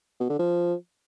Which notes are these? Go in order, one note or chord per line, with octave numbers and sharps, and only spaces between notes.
B2
D3
F3